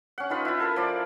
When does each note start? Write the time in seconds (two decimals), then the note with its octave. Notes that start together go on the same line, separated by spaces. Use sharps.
0.18 C#4 F#5
0.30 D#4 F4 B4
0.45 E4 F4
0.60 A4 A#4
0.76 F3 D5